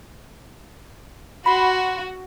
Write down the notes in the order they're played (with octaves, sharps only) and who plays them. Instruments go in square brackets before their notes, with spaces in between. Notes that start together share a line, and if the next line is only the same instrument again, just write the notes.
[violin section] F#4 [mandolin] B5 C6